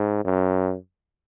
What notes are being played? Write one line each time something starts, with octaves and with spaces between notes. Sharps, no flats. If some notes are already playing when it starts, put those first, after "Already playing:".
Already playing: G#2
F#2